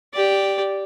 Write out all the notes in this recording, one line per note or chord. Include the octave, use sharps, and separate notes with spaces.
G4 D5